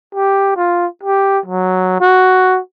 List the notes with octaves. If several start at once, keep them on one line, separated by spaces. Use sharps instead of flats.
G4
F4
G4
F#3
F#4